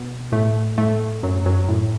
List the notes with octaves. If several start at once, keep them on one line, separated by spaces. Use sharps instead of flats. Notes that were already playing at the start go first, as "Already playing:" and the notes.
Already playing: B2 B3
A2 A3
A2 A3
F#2 F#3
F#2 F#3
A2